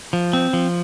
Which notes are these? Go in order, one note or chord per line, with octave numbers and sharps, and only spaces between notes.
F3
C4
F3